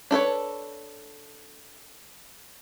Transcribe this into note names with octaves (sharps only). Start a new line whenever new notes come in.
D4 A4 B4 C#5